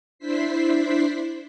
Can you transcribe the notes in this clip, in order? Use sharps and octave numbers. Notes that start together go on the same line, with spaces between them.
D4 E4 C5 B6 C7